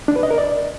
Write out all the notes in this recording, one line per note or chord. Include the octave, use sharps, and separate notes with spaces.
D4
B4
D#5
A#4
D5